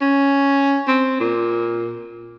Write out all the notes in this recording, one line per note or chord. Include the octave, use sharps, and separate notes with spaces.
C#4
C4
A#2